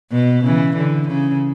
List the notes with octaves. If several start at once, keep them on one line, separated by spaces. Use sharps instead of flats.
B2
C#3 E3
D3
C#3